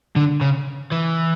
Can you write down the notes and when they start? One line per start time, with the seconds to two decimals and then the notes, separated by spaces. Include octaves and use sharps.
0.16 D3
0.41 C#3
0.92 E3